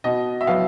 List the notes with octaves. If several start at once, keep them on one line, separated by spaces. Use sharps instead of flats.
B2 D#5
E5
F#3 B3 F5